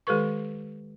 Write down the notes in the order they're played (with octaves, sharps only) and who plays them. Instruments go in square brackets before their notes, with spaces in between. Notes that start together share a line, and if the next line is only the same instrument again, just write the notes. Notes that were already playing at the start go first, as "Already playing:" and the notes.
[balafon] D#3 G#3 G4 A4 B4 C#6